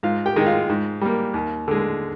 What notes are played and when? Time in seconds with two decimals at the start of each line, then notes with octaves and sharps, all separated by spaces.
0.03 G#2 F4 F5
0.26 G4 G5
0.36 D#3 G#3
0.46 F4 F5
0.69 G#2
1.01 G3 A#3
1.34 D#2
1.68 D3 G#3